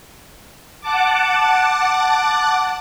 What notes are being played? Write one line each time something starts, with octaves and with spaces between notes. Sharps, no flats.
F#5 A5 D6